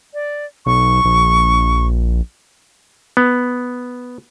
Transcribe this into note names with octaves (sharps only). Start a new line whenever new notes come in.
D5
B1 C#6
A#1
B3